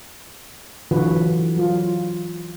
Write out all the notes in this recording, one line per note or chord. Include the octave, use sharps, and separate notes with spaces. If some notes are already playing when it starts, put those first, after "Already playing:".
D3 E3 F#3 F4 F#4 B4
F#3 F4